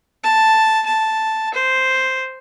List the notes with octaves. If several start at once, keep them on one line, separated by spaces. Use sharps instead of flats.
A5
A5
C5